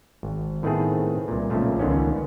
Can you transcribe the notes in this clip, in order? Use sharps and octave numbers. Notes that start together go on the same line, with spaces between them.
G#1
A2 D#3 A3 B3 C4 G#4
C2 A#2
B1 A#2 C#3 F3 A3
C#2 D3 D#3 B3 C#4